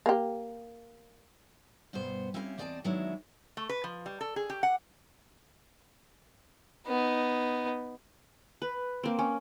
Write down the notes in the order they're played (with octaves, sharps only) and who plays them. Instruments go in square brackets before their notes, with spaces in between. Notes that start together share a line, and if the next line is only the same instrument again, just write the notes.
[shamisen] A#3 G4
[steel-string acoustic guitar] G2 B2 B3 C5
C4 C#4 E4 G4 E5 F5
E2 C4 D5 D#5 G5 A5
D#3 F#3 G#3 B3 D4 E4
[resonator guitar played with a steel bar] A3
B4
F3
G3
A4
G#4
G4
F#5
[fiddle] B3 D#4
[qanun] B4
A#3 C4
C#4